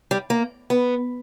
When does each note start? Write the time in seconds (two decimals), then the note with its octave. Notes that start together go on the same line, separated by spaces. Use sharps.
0.11 G3
0.30 A#3
0.70 B3